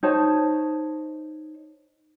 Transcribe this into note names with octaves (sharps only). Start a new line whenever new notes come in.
D#4 C5 C#5 A5